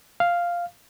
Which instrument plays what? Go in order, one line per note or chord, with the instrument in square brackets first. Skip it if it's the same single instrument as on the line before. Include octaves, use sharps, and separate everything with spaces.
[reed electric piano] F5